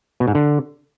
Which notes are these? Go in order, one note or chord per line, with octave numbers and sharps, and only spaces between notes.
B2
G#2
D3